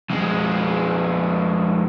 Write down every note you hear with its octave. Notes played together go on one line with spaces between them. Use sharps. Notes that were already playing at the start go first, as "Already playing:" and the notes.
F2 G#3